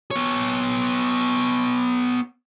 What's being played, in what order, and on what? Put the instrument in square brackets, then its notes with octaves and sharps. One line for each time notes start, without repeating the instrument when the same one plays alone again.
[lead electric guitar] B3 C#5